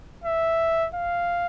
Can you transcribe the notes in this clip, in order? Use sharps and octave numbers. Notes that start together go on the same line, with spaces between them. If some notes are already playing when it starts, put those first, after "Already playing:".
E5
F5